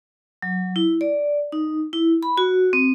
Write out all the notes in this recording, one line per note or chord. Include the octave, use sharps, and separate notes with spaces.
F#3
E4
D5
D#4
E4
B5
F#4
C4